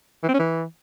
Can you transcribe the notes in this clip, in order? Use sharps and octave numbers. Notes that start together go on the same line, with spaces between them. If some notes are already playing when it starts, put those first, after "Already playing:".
E3
C4
C#4
E3